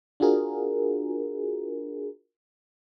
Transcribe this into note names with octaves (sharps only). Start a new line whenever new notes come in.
D4 F4 F#4 G#4 A#4